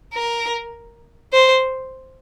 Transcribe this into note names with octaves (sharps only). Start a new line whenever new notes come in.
A#4
C5